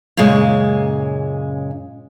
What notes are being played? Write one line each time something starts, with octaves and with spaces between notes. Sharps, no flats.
F#2 A#2 C#3 G#3